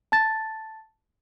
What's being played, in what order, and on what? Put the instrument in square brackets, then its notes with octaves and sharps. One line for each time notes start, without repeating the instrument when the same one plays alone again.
[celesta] A5 A6